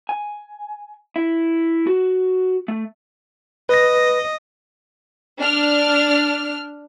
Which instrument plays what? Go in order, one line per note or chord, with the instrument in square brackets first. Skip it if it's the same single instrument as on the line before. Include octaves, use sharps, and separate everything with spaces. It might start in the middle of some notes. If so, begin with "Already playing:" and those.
[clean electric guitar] G#5
E4
F#4
A3
[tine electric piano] B4 A#6 [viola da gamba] D#5
[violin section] D4 F6